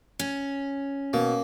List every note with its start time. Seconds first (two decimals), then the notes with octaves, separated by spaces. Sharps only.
0.19 C#4
1.13 B2 A#3